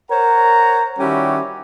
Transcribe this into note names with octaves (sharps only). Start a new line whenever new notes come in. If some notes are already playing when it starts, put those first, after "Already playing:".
A#4 C5 C#5 F#5 A#5
D#3 G3 C#4 E4 F#4 G4